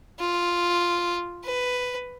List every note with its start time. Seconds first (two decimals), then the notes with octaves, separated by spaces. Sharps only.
0.20 F4
1.44 B4